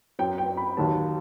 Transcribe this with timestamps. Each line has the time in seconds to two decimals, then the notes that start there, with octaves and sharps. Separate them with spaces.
0.19 F#2 F#3 G5
0.38 G5
0.57 B5
0.77 D#2 D#3 F#3 A5